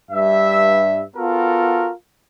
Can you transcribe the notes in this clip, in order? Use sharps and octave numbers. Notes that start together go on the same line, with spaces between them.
G2 E5
B3 F4 F#4 A4 A#4